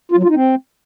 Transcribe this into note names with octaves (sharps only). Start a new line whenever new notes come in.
F4
F#3
F4
D#4
C4